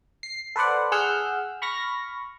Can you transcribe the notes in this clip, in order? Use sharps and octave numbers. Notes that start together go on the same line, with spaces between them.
C7
A4 B4 C5 D5 F#5
G#4 F#5 E6 F6 G6
B5 C#6 F6 A#6